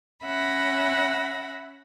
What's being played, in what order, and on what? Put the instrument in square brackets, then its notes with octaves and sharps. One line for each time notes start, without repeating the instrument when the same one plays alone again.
[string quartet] C#4 E5 F#5 B5 A#6